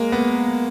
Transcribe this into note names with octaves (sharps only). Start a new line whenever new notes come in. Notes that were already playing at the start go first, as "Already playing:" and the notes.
Already playing: G#3 A#3
B3